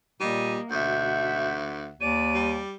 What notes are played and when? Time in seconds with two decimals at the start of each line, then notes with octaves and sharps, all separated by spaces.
0.20 A#2 G3 A#3 D#5 D#7
0.71 D2 B2 E5 F#5 G6
2.01 D#2 D5 D#7
2.34 G3